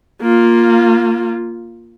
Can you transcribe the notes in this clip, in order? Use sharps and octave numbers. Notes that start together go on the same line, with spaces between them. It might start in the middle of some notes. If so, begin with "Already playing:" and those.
A#3 F4